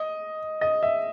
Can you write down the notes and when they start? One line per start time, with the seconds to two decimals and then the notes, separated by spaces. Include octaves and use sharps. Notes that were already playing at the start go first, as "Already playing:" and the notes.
Already playing: D#5
0.61 D#5
0.83 E5